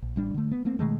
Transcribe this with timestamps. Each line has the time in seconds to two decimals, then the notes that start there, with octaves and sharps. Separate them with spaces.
0.02 A#1
0.16 A1 G3 D4
0.34 D3 A3
0.51 B3
0.65 A3 A#3 C4
0.79 B2 D#3 G#3 A3